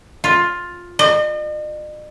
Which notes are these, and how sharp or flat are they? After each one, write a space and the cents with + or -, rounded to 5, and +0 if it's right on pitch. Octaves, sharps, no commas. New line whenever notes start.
F4 +10
D#5 -45